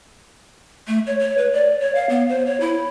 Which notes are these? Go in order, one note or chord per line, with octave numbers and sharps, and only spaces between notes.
A3
C#5
C#5
B4
D5
C#5
F5
B3
C5
C#5
E4